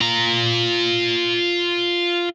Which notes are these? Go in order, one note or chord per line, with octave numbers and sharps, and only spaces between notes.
F4 A#5